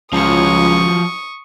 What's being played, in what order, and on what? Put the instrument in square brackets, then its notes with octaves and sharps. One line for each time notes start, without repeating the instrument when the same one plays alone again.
[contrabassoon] C#2 [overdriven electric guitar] F3 F#3 [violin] C#6 D#6